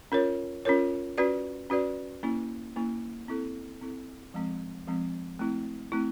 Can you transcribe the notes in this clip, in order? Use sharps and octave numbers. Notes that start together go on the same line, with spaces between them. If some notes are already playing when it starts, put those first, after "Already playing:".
C#4 F4 A#4 C#5
C#4 F4 A#4 C#5
C#4 F#4 B4 D5
C#4 F#4 B4 D5
A#3 C#4 E4
A#3 C#4 E4
C4 E4 A4
C4 E4 A4
F3 G#3 C4
F3 G#3 C4
A3 C4 E4
A3 C4 E4